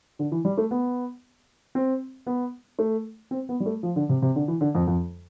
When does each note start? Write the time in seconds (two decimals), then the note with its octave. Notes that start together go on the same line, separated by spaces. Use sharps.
0.19 D3
0.32 E3
0.45 G3
0.58 A3
0.71 B3
1.75 C4
2.27 B3
2.79 A3
3.31 C4
3.49 B3
3.60 G3
3.66 A3
3.83 F3
3.96 D3
4.09 C3
4.22 C3
4.36 D3
4.48 E3
4.61 D3
4.75 F2
4.87 F2